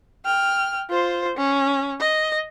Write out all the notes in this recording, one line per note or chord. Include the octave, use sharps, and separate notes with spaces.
G5 F6
F4 C5
C#4
D#5